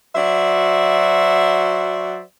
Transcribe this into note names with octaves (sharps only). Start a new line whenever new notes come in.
F#3 F#4 C5 D5 E5